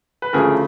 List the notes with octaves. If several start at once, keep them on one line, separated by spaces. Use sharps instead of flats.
B4
D2 C#3 F3 A3 G#4 A#4